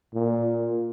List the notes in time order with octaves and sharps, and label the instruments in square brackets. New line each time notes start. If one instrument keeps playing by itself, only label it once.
[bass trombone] A#2